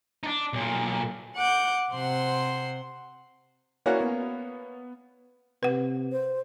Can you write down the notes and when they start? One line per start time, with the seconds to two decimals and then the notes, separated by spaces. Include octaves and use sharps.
0.23 D4 D#4
0.53 B1 A#2
1.36 F#5 D6 G6
1.92 C3 C5 F#5 C6
3.86 A#3 C#4 E4 F#4 D5 F#5
4.01 B3
5.63 C3 B4 F#5
6.12 C5